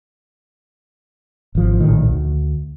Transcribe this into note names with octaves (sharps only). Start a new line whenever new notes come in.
G#1 F3
A#1 A2 D#3
D2